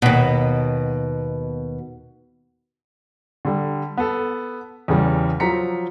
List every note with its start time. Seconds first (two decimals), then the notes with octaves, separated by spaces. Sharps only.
0.02 D#2 B2
3.45 D3 G3
3.97 B3 A4
4.88 E2 C#3 G3
5.40 F3 F#3 A#5 B6 C#7